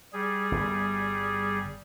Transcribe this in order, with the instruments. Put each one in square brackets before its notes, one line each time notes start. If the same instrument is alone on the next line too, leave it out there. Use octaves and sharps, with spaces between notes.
[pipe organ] G3 G#4
[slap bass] G1